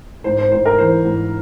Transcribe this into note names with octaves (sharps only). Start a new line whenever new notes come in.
G#2 C5
C5
G#2 C5
A#4
E3 C5
G#2